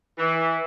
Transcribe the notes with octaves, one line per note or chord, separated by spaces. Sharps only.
E3